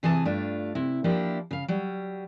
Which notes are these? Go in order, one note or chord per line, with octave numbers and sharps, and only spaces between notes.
C3 E3 G#4 G#5 A5
G2 A3 D4 F4
C3 E4
F3 A#3 D4 E4 G4
C#3 F5
F#3 G3